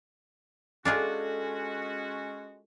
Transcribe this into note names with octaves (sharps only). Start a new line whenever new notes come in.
G#3 C#4 D4 F4 F#4 G#4 A4